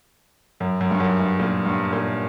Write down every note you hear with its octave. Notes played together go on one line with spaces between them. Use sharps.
F#2
F#2
G2
F#2
G2
A#2
G2
A#2